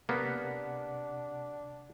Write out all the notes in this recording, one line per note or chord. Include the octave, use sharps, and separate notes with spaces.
C3 A#3 B3 D4 F#5 B6